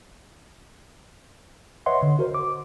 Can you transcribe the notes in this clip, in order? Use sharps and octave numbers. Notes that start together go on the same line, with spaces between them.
B4 C#5 D#5 E5 F#5 C6
D3
F#4 A#4 C5
D6